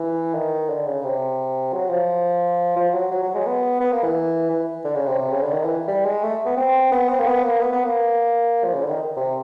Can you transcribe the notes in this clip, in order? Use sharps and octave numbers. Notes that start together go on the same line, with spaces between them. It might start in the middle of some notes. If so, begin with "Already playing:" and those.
Already playing: E3
D#3
D3
C#3
C3
F#3
F3
F3
F#3
F#3
F#3
G#3
B3
B3
A#3
E3
E3
D3
C#3
C3
C3
C#3
D3
D#3
E3
G3
G#3
A3
B3
C4
B3
C4
A#3
B3
A#3
B3
B3
A#3
F3
C#3
D3
D#3
C3